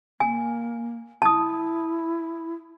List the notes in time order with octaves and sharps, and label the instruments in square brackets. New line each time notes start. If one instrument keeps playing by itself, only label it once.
[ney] A#3 [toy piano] G#5
[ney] E4 [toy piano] A5 D#6